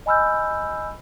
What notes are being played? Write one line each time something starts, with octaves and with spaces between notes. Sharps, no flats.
D#5 G#5 B5 E6 F6 G6